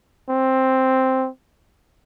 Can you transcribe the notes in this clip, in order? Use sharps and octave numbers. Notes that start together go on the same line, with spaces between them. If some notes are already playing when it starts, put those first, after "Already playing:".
C4